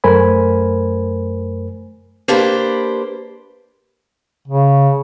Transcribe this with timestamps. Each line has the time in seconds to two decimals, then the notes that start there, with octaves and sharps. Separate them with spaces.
0.04 F#2 A3 A#4 C5 G#5 B5
2.28 A#3 D4 G4 B4 C5
4.48 C#3